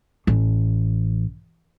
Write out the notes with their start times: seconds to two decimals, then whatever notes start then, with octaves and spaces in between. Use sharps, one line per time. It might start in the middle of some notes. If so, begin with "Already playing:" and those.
0.27 A1